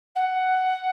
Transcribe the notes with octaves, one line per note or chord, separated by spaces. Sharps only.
F#5